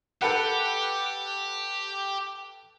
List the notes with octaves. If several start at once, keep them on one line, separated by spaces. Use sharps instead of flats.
G4 A4 B4 F#5